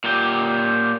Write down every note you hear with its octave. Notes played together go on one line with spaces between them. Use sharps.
A#2 G4